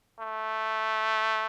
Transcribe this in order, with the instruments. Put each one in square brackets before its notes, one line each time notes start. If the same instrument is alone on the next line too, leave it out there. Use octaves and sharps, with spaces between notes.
[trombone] A3